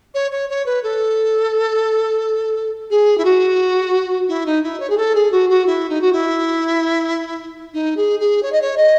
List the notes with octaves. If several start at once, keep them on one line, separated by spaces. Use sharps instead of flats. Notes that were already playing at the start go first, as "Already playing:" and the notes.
C#5
C#5
C#5
B4
A4
G#4
E4
F#4
E4
D#4
E4
C#5
G#4
A4
G#4
F#4
F#4
E4
D#4
F#4
E4
D#4
G#4
G#4
C#5
D#5
C#5
D#5